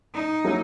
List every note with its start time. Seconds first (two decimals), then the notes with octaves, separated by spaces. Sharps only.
0.14 D#4
0.44 F#3 A#3 E4